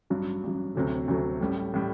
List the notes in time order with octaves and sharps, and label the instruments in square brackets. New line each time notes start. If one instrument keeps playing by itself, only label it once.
[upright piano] A1 G2 F#3
A1 G2 F#3
D2 C3 F#3 A3
D2 C3 F#3 A3
A1 A2 G3
A2 G3